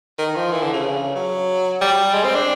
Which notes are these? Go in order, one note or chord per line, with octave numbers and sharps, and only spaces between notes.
D#3
F3
E3
D3
C#3
F#3
G3
G#3
C4
D4